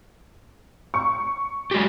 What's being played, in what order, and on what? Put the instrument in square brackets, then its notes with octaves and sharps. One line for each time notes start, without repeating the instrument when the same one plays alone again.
[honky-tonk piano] C#6
[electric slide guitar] G#3 F#4 G4